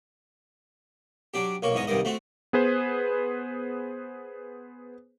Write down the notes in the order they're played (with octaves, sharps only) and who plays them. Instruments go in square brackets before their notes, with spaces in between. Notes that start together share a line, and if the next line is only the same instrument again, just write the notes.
[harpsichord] F#3 D4 G4
B1 A#3 C#5
E2 G#2 C#5 D#5
C2 G2 D#3 D#5
A3 C4 F#4
[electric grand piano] B3 G#4 B4 C5